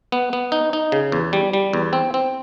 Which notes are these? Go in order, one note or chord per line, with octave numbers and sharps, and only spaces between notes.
B3
B3
D#4
D#4
C#3
E2
G3
G3
E2
C4
C4